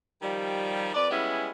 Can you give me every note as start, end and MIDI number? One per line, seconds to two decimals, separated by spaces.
0.22 0.90 51
0.22 0.90 53
0.22 0.90 55
0.94 1.10 41
0.94 1.10 71
0.94 1.10 74
1.11 1.51 55
1.11 1.51 56
1.11 1.51 59
1.11 1.51 61
1.11 1.51 64